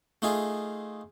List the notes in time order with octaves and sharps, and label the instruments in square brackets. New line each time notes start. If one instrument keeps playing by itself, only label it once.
[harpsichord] A3 D#4 F4 G#4